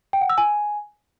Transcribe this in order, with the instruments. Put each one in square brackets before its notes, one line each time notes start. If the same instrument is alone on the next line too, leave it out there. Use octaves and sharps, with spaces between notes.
[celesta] G5
F#5
E6
G#5